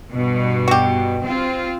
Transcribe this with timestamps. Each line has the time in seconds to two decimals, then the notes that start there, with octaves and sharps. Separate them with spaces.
0.12 G2 B2
0.68 F#4 G4
1.25 C4 F4